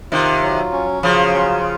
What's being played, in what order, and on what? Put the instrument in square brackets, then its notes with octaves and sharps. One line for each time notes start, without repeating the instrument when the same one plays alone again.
[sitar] C3 D#3 [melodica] F4
[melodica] F#3
C#4
[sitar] C#3 F3 [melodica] F#3
[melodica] F4